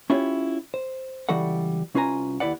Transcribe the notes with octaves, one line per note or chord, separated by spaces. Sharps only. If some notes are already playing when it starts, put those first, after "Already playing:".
C#4 E4 F4 G4 C#5
C5
C#2 E3 G3 F#4 A4 F#5
C2 C#4 F4 B4 G#5 A#5
D#2 B2 E4 B4 D5 F#5